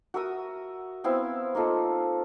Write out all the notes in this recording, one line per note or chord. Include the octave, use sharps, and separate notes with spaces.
F#4 A#4 E5 D#6
B3 C4 E4 F5
A#3 D#4 F4 A4